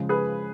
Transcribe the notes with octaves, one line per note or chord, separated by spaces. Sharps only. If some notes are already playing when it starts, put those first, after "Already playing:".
Already playing: C#3 F3 G#3
G#4 B4